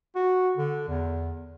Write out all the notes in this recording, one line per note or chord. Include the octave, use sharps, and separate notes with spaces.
F#4
D3
E2